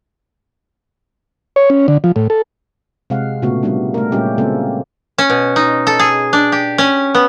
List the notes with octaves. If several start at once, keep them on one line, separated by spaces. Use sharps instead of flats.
C#5
C#4
D3
F3
A2
A4
C3 G#3 F5 F#5
A#2 C#3 A3 B3 F#4
G3 A#3 B3 D4
A3 A#4
A#2 G3 G#3 A#3 C#4 G4
C#3 G#3 A#3 C4 A4
C#4
B2
D#4
A4
G#4
D4
G4
C#4
B3